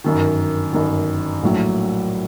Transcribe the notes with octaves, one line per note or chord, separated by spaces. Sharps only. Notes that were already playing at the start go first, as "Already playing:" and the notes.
G1 F#2 D#3
G1 F#2 D#3
A#1 A2 F#3